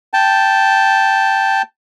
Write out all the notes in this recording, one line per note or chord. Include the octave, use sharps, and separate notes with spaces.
G5 A5